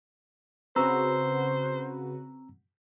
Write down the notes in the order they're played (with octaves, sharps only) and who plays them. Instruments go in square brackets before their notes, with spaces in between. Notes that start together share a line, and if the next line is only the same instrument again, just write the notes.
[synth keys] C#3 F#4 B4 [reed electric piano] C4 A#5 E6 [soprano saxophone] C5